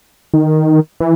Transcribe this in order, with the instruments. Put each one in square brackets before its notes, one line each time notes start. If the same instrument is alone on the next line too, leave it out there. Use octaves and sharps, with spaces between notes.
[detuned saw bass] D#3
E3